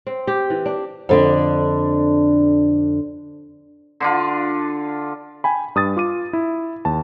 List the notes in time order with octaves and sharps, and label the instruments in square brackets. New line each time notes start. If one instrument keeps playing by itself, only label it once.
[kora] C4
G4
E3
D4
[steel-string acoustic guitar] F2 D3 D4
[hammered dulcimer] D3 D4 F4
[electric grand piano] G5 G#5 B5
G2 D#6 A6
F4 D6 D#7
E4
D#2 A5